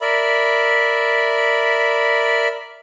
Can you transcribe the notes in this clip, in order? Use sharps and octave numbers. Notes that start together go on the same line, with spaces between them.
A#4 D5 E5 B5